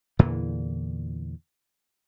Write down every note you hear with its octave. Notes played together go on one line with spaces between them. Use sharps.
E2 A#2 D3 E3